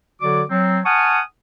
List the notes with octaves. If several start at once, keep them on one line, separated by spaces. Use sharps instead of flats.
D3 F#3 F#4 D5 D6
F#3 C4
F#5 G#5 A5 C#6 D#6 F6